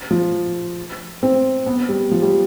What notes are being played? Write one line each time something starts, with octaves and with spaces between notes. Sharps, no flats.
F3
C4
B3
G3
F3
G3